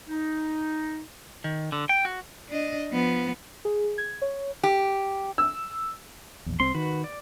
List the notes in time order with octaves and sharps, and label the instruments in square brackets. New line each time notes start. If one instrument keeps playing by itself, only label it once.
[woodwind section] D#4
[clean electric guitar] D#3
D3
G5
F#4
[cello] D4 D#5
F3 B3
[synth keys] G#4
G#6
C#5
[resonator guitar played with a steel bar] G4
[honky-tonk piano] E6
[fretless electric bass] A#1 E2
[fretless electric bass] C2 C4 [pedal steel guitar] C6
[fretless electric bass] D#3 [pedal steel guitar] F#4 B4
[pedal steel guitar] D5